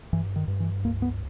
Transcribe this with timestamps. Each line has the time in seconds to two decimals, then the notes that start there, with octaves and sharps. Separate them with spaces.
0.13 G2 E3
0.36 D#3
0.48 G2
0.60 E3
0.85 C#2 A#3
1.02 B3